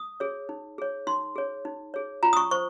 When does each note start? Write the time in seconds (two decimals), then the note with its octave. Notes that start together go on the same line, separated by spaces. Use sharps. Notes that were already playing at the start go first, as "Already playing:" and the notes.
Already playing: D#6
0.20 G#4 C#5
0.49 D#4
0.78 G#4 C#5
1.07 D#4 C6
1.36 G#4 C#5
1.65 D#4
1.94 G#4 C#5
2.23 F4 A#5
2.33 D#6
2.37 C#6
2.51 C5 C#6